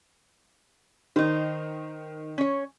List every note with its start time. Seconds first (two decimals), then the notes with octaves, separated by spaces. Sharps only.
1.16 D#3 D#4 C5
2.38 C#4 C#5